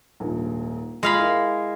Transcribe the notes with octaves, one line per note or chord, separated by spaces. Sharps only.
D#1 A#1 G#2
G#3 F4 F5 B5
E4 A#4